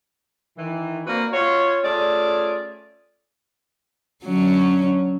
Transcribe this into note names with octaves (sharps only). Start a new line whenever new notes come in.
D#3 E3
A#3 C4 D4 F#4 B4
F4 F#4 C#5
A3 C#4 F4 G#4 D5
D3 F#3 C#4